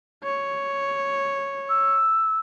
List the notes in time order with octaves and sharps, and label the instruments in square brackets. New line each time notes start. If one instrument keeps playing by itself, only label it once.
[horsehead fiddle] C#5
[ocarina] E6